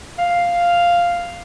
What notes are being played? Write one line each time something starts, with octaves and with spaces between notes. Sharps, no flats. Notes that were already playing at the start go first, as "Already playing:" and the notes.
F5